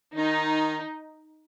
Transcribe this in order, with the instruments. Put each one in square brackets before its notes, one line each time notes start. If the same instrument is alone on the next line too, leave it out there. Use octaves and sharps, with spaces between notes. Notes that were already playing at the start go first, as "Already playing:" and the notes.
[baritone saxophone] D#3 [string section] D#4